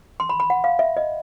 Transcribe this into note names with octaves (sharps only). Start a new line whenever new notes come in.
C6
B5
B5
F#5
F5
E5
D#5